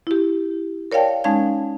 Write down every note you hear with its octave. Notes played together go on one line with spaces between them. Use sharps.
E4 G4
A#4 C#5 D5 F5 G5 A5
G#3 C#4 D#4 F5 A5 G#6